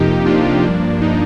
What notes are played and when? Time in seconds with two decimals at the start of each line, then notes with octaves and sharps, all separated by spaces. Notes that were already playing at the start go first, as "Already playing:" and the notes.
Already playing: F2 C3 F3 A#3 D#4 G4
0.26 D4 F4
0.63 G2 F3 A#3 D4
1.02 D#4